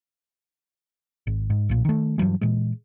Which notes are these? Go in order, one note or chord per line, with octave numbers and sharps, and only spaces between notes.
G#1
G#2
B1 A#2
D#3 A3
G2 E3 F#3 G#3
A#2 E3 G#3